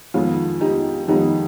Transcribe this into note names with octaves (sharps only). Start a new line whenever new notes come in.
F2 D#3 G#3 B3 F4 G#4
D#4 G4
F2 D#3 G#3 B3 D#4 G4